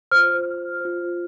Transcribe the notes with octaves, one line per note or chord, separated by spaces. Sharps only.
F4 C5 F6
F4 C5